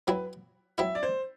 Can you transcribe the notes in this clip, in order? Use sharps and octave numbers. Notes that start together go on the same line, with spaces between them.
F#3 C4 E4 B4
F#3 C4 E4 E5
D5
C5